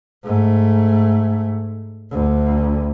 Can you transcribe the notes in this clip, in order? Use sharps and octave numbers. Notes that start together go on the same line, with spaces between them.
G#2 A3
D2